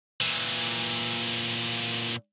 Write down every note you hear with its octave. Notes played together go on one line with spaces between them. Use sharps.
A#2 E3